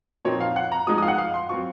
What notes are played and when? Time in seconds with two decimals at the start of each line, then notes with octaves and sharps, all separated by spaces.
0.25 A#2 F3 C4 D#4 C#5
0.41 F5
0.56 F#5
0.72 A#5
0.87 F3 G#3 D#4 D#6
0.98 F5 D#6
1.08 F#5
1.18 F5
1.34 C6
1.49 F#3 C4 F4 C#6